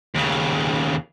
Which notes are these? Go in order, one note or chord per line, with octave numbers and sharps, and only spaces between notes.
D#2 C#3